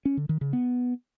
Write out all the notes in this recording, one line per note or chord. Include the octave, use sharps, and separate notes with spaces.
C#4
D3
D#3
C#3
B3